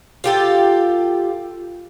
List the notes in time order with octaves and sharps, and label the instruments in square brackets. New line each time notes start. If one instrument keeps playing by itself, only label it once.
[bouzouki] F4 G4 A4